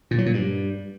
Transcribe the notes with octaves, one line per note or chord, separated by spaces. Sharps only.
A#2
F#3
A#2
G2